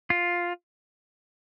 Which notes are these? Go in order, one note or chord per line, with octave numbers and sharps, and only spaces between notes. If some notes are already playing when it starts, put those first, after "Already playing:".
F4